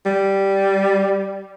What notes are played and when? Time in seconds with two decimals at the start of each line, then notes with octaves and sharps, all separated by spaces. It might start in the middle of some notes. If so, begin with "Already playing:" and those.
0.06 G3